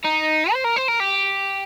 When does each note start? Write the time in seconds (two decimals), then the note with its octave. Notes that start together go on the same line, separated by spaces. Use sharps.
0.05 D#4
0.53 C5
0.64 A#4
0.76 C5
0.88 A#4
1.00 G4